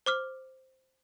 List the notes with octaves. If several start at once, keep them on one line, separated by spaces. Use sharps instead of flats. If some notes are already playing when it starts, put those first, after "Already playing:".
C5 D6 F6